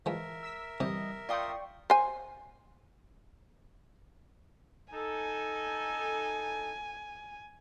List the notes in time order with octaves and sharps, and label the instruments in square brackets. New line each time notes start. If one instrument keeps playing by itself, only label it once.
[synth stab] E3 [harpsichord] F3 G#3 [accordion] A#4 E5
[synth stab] E6 B6
[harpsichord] C3 [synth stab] E3 G3 [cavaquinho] D#5
[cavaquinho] F4 C6 D#6 [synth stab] D5 G5 C#6
[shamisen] C5 G#5
[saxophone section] D#4 A4 [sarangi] G#5